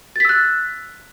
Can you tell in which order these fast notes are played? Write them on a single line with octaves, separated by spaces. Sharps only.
A6 B6 E6 F#6